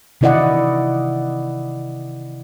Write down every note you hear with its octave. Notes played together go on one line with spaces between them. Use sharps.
C3 D#3 E4 D5 D#5 F#5